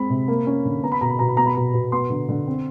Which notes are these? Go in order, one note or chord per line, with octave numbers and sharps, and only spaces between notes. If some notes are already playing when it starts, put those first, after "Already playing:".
Already playing: G#3 C4 B5
C3
A#3
C#4
D3
B3 A#5
B5
B2 A#5
B5
B2 A#5
B5
B3 A#5
B5
B2 A#5
B2
B3 C6
D3
D3
C4